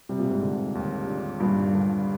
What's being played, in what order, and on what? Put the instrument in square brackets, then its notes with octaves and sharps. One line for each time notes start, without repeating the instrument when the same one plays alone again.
[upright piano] C3 [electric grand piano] G3
[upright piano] A#2
G#2 C3
[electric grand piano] D3
D#2
D4
[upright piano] G2 A#2 [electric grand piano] G3
[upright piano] G2 [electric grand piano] D3